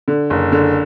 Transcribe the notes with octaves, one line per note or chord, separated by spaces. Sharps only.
D3
F#1
D3